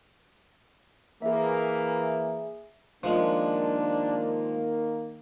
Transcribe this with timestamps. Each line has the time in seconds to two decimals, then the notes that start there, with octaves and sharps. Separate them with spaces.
1.22 E3 A#3 G#4 E5
3.03 D#3 F3 G#3 A#3 D4